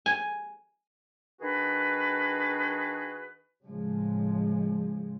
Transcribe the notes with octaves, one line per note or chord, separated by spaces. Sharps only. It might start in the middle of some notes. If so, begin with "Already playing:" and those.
G#5
D#3 D4 F#4 G#4 B4
A2 C#3 F3 G#3